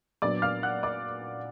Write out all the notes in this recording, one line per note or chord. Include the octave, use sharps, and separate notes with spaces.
A#2 F#3 B3 D4 D5 D6
F5 F6
F#5 F#6
D5 D6